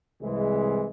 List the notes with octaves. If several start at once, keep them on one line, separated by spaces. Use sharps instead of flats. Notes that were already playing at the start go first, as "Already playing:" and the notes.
C2 E3 G#3